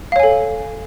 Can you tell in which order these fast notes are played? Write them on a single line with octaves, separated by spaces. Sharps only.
F5 C#5 G#5 A4